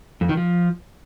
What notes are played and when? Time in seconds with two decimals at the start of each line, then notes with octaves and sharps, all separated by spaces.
0.21 F2
0.29 D#3
0.37 F3